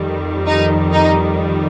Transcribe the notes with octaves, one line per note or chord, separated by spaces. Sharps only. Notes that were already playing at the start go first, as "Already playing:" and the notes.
Already playing: F2 D#3 G3
D#4
D#4